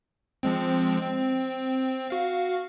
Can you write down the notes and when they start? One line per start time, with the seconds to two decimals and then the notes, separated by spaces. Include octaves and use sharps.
0.43 F3 G#3 C4
1.01 C4
2.10 F#4 F5